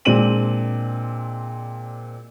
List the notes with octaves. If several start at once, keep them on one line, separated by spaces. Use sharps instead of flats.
A#2 G#3 C4 D4 D#7 F#7